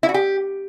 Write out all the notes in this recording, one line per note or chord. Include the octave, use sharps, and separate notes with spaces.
E4
F#4
G4